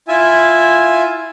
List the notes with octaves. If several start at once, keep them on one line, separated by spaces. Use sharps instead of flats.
E4 F4 E5 G#5